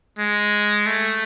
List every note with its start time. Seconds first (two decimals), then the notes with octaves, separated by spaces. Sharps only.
0.19 G#3
0.86 A3